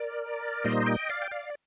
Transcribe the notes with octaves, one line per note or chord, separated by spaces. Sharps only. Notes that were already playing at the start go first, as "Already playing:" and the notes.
Already playing: A#4 D5
A#2 G3 A#3 D#4 C5 D#5
D#5 G5
D5 F5
G5
D5 F5